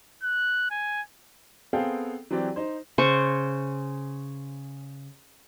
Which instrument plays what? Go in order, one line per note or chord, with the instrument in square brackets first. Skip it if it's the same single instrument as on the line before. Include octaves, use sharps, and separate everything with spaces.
[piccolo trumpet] F#6
G#5
[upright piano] B3 C4 G#4 A4 F5 G5
E3 F#3 C4 G4 D5
D#4 C5
[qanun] C#3 C5 C#6